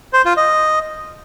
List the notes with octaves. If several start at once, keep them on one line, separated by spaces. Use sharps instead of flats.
C5
F4
D#5